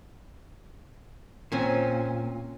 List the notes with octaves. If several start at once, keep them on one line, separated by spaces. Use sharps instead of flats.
A#2 C4 C#4 G#5